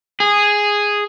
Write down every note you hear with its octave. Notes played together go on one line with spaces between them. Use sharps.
G#4